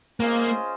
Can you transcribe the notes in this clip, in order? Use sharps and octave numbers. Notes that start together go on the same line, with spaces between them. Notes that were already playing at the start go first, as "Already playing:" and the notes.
A#3 C#4 F4 G#4 C5 D#5